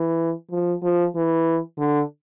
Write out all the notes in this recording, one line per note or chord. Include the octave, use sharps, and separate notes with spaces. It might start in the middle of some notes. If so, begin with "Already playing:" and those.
Already playing: E3
F3
F3
E3
D3